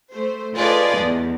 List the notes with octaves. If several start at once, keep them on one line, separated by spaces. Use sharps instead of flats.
A3 C5
F4 G#4 A4 B4 D5 D#5
E2